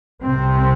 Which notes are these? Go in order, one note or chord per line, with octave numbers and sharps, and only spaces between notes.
C2 C3 C4